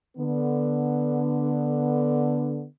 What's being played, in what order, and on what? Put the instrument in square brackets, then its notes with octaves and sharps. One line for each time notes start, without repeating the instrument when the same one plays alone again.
[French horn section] D3 B3